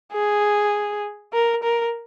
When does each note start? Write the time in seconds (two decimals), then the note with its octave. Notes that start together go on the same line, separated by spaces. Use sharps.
0.12 G#4
1.33 A#4
1.63 A#4